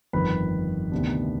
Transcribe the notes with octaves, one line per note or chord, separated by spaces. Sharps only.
G1 F2 D#3 B4 B5
D2 C3 D#3 B3 D4